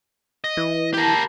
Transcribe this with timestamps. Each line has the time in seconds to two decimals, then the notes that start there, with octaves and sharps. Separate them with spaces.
0.44 D#5
0.57 E3
0.94 G4 A#4 B4 A5